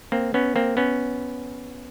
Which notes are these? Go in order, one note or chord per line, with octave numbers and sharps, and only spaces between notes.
A#3 C4
B3 C#4
A#3 C4
B3 C#4